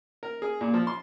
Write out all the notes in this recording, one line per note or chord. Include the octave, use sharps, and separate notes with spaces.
A#4
G#4
A#2
F3
C6